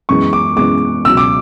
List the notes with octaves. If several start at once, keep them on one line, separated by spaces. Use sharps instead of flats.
F#2 E3 G#3 B3 C#6
D6
F#2 E3 G#3 B3 D6
C#2 B2 F#3 E6
D6